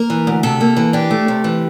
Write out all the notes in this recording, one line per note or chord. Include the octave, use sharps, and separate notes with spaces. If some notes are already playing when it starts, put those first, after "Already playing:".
Already playing: A#3 A#4
E3
D2
C3 A4
A#3
E3
D4 G4
A3
C3
E3